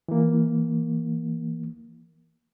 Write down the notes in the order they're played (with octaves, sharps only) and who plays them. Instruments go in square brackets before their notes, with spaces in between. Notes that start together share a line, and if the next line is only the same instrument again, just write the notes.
[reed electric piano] E3 A#3